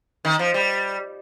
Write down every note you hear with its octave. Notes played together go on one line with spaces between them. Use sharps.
D#3
F3
G3